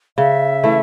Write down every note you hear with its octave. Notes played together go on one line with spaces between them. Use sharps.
C#3 E5
E3 A3 E4